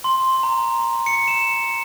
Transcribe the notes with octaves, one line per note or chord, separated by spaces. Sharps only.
C6
A#5
C#7
E7